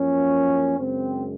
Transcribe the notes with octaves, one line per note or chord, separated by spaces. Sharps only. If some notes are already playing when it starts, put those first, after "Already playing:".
Already playing: F#2 F3 A#3 C#4
F#2 C#3 G#3 C4